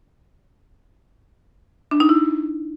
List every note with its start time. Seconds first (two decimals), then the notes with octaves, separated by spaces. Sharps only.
1.91 D4
2.00 D#4
2.09 E4